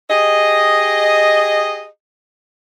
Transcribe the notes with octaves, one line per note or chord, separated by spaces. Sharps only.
G4 G#4 D#5